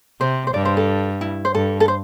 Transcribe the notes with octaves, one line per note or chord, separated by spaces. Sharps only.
C3 C5
C5
G2 D5
C5
A4
E4
C5
G2 A4
A4
C5